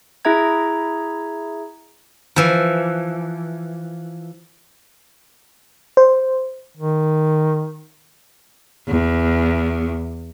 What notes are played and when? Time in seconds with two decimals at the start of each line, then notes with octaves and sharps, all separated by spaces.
0.25 E4 G#4 E5 A#5 G#6
2.36 E3 F3
5.97 C5
6.78 D#3
8.87 E2